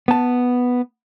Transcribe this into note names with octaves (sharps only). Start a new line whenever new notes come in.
B3 A5